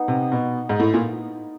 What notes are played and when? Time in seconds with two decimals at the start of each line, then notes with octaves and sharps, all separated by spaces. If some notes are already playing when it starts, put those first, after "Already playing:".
Already playing: B3 D#4
0.08 C3
0.32 B2
0.69 G#2
0.80 A2
0.94 A#2